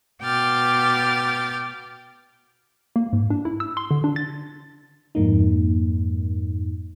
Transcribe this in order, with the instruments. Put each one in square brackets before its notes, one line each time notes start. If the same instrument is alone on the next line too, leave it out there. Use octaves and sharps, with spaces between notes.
[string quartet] B2 G5 D6 F6 A6
[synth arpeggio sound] A#3
G#2
D4
E4
E6
C6
D3
D4
A6
[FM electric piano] F2 G#2 A#3 D#4